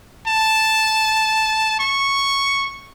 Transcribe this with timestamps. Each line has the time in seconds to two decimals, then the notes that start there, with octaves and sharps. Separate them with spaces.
0.27 A5
1.80 C#6